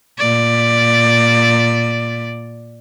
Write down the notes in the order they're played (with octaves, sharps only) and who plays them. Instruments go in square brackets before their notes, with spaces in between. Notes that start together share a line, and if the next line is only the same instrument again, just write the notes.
[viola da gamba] A#2 D5